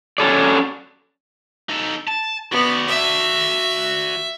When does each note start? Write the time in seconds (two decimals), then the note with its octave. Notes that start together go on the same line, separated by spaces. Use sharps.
0.18 F#3 C#4 A4 D5
1.69 D#4 A4
2.07 A5
2.52 B3 F#4 D5
2.89 E5